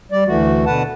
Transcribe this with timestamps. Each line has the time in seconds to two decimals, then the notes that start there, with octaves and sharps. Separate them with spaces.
0.12 G3 D5
0.27 D2 E3 A3 F#4
0.66 B2 D3 B4 F#5 A5